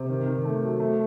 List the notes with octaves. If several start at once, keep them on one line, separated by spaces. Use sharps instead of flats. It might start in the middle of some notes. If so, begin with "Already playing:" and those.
Already playing: C3
D#3
D#3
A3
F#3
A3